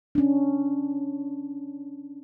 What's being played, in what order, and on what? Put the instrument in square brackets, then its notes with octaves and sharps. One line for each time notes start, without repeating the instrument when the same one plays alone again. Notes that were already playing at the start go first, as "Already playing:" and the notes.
[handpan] C#4 D4